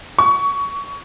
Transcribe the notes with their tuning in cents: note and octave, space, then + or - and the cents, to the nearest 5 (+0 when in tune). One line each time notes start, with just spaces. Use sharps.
C#6 +20